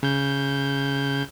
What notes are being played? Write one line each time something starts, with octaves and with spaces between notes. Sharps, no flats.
C#3 G6